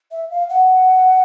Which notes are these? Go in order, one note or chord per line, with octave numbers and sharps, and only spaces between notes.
E5
F5
F#5